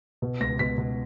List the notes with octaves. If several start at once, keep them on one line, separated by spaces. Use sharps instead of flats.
B2
C#2 A#6
B2 B6
B2